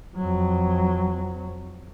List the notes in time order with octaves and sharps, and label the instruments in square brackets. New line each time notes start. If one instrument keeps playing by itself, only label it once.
[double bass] F2 F#3